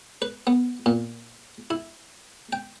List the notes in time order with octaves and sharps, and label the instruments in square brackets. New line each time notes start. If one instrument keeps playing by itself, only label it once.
[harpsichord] B4
B3
A#2
E4
G5